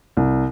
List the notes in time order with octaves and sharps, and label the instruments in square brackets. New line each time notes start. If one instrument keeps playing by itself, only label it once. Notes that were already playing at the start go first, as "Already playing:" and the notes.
[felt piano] C2